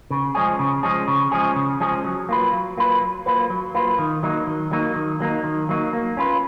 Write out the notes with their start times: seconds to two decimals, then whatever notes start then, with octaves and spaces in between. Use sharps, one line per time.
0.10 C#3
0.35 F3 G#3 C#4 G#4
0.59 C#3
0.83 F3 G#3 C#4 G#4
1.08 C#3
1.32 F3 G#3 C#4 G#4
1.56 C#3
1.80 F3 G#3 C#4 G#4
2.05 F#3
2.29 A#3 F4 B4
2.53 F#3
2.78 A#3 F4 B4
3.01 F#3
3.26 A#3 F4 B4
3.50 F#3
3.75 A#3 F4 B4
3.99 D#3
4.23 F#3 A#3 D#4
4.47 D#3
4.71 F#3 A#3 D#4
4.96 D#3
5.20 F#3 A#3 D#4
5.44 D#3
5.69 F#3 A#3 D#4
5.93 A#3
6.17 C#4 F4 B4